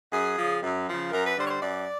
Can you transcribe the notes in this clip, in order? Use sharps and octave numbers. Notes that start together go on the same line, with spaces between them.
F#2 G#4
C#3 F3
F#2
C#3 F3
F#2 A#4
B4
D3 G3 C5
C#5
C5
F#2 D5